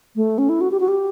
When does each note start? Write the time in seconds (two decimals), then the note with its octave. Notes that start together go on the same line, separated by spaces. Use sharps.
0.16 A3
0.38 C#4
0.49 E4
0.61 F#4
0.71 G4
0.80 F#4
0.88 G4